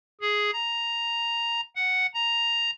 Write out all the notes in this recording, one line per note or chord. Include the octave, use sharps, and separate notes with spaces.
G#4
A#5
F#5
A#5